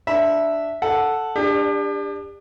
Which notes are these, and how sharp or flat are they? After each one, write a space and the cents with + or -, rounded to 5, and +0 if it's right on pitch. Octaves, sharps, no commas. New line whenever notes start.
D4 +0 E5 +0 B5 -30
A4 +0 F#5 +0
D4 +0 G4 +40 D5 +30